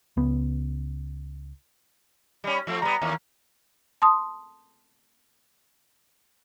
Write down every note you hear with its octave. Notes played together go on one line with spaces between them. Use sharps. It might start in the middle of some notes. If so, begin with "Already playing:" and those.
C#2 B3
G3 C#4
F3 A3 C4
G3 B3 A#5
D#2 A#3 C#4
A5 C6 D#6